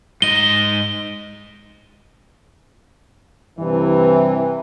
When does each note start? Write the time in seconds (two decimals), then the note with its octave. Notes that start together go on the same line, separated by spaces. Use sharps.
0.22 G#2 D#5 G7
3.59 G2 C3 E3